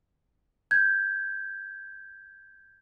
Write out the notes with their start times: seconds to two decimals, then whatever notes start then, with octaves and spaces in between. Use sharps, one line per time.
0.71 G6 G#6